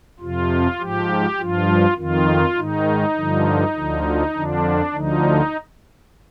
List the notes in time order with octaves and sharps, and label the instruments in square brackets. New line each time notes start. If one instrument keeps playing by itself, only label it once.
[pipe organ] F2 C3 F3 F4
G#2 F3 G4
G2 F3 F4
F2 D#3 F4
G#2 D#3 D#4
G2 D3 F3
D2 D3 F3
F2 D3 F3 D4
D2 D3 F3 D#4